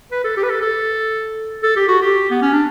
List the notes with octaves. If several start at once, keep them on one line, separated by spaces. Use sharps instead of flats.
B4
A4
G4
B4
A4
A4
A4
G4
F#4
G4
B3
C#4
D4